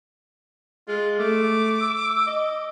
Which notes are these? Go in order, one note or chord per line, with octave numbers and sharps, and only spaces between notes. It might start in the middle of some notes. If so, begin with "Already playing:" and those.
G#3 F4
A3 D6
E6
D#5